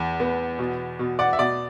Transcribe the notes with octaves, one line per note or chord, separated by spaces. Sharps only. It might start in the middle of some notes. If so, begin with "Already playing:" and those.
Already playing: E2
B3
B2
B2
D5 F#5
E5
B2 D5